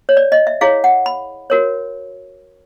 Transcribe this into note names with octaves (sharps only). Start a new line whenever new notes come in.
C#5
D5
D#5
E5
E4 G#4 C#5 F5
F#5
B5
F#4 A#4 C#5